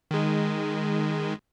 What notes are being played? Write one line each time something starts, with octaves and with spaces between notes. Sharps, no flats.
D#3 G#3